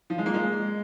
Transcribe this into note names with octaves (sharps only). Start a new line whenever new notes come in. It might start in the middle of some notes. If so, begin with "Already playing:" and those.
F3
G#3
A#3
G#3